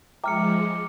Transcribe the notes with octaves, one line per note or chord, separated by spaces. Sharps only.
F3 G#3 E5 G5 A#5 D6 F6 C#7